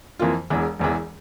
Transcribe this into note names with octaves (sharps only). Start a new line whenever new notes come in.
F2 E3 A#3 F4
E1 E2 E3
E1 E2 E3